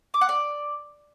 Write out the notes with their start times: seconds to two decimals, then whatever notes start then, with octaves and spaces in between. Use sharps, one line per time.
0.14 D6
0.21 F#5
0.29 D5